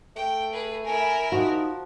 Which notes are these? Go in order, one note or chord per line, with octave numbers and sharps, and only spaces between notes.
A3 G5
G#4 B4
E4 A#4 G#5
F3 D#4 F#4